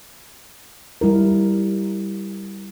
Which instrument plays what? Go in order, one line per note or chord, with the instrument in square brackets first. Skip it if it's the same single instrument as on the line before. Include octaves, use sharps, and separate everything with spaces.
[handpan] G3 E4 A#4